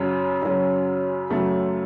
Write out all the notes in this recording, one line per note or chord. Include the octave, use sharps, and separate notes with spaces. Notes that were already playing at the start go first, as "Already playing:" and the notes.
Already playing: F#2 C#3 F#3 C#4
F#2 C#3 F#3 C#4
F#2 C#3 F#3 A3